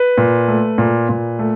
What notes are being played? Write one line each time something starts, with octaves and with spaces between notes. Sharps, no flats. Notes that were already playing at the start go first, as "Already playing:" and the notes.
Already playing: B4
A#2
A3
A#2
A#2
A3